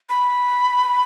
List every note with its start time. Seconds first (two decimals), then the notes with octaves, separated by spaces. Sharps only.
0.10 B5